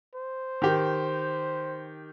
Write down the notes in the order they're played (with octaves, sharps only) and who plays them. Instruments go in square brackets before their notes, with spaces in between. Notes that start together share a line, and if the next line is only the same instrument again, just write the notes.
[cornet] C5
[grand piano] D#3 G4